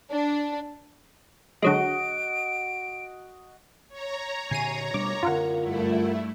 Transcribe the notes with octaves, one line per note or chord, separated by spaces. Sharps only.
D4
D3 F#3 G#3 F#4 D#5 D7
C#5 A#5
A#2 D3 G#5 C7 D#7
B2 G3 D4 D6
F#2 D3 F4 A#4 F#5
G2 A3 E4